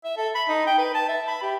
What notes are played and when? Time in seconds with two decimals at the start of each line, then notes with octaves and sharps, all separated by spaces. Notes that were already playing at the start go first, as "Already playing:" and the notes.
0.05 E5
0.17 A4
0.35 B5
0.48 D#4
0.67 G5
0.78 B4
0.95 A5
1.09 E5
1.28 B5
1.42 G4